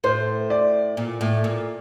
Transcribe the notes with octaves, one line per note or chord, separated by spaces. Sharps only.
A2 C5
D5
A#2
A2
A#2